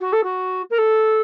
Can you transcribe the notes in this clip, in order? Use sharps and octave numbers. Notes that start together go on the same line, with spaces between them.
F#4
A4
F#4
A#4
A4